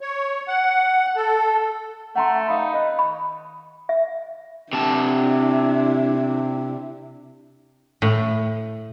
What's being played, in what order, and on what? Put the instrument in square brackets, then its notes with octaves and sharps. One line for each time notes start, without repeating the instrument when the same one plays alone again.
[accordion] C#5
F#5
A4
[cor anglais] A3 [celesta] F#5 A#5 C6
[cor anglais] D#4 [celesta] F5 B5
[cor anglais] B4 [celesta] D#5
[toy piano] B5
E5
[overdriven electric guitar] C3 A5 [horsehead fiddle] D4 E4
[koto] A2